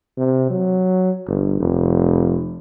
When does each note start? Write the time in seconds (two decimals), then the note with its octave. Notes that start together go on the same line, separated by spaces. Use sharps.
0.17 C3
0.50 F#3
1.28 G1
1.60 F1